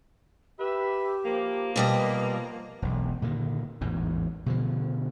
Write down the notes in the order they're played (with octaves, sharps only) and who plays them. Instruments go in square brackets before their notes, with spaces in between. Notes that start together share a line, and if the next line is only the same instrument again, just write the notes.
[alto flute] G4 [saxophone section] B4 E5
[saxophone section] F3 A#3
[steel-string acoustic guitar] B2 G3 D#5 [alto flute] B4
[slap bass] E1 B1
A#2 D3 D#3
A1 E2 G#2
B2 D3 F3